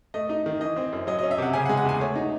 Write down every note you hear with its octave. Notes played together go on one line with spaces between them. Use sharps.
A3 D#5
D#4
D#3
E3 D#5
C4
F#2
F#3 D#5
C#4 D#5
E5
C3 F#5
C#3 G#5
F#5
G#3
F#5
E2 G#5
A3 C#5
D#4